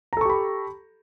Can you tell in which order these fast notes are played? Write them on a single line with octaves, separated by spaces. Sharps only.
A#5 A4 C#6 G4 B5